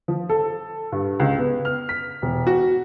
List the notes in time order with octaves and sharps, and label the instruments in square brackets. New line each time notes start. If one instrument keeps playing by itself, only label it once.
[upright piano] F3
A4
G2
C#2
B3
F6
B6
E1
F#4